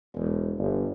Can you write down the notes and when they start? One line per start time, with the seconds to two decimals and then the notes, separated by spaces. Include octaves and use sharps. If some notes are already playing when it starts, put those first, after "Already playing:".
0.15 E1
0.58 G1